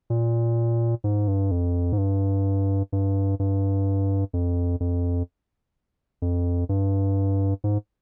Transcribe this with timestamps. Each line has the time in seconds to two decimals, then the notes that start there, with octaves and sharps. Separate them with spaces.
0.10 A#2
1.04 G#2
1.28 G2
1.51 F2
1.92 G#2
1.98 G2
2.92 G2
3.39 G2
4.33 F2
4.80 F2
6.22 F2
6.69 G2
7.64 G#2